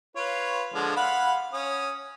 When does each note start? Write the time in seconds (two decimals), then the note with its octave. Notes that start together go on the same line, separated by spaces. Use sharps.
0.16 F4 B4 C#5
0.74 D3 F3 G#3
0.96 F5 F#5 B5
1.53 C#4 D#6